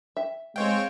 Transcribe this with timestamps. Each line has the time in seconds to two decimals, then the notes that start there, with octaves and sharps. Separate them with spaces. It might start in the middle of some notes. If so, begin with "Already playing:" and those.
0.17 E5
0.56 G#3 C4 C5 C#5 F5 G5